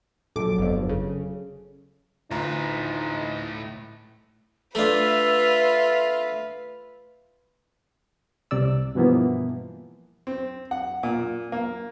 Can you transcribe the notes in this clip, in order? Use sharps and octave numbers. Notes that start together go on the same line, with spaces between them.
A#1 F#3 A4 D6
G1 F2
C#3
D2 A2 D#4 F4 B4 A#5
A3 D4 F4 B4 E5
C2 C3 D5 E6
G2 B2 E3 F3 A#3 B3
C4
F#5
A#2
A#3